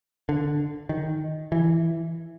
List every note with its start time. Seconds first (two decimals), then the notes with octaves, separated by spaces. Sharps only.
0.29 D3
0.89 D#3
1.52 E3